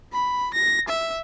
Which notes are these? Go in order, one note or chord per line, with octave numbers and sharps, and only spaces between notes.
B5
A#6
E5